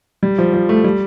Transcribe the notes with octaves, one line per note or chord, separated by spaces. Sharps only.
G3
F3
F3
A3
G3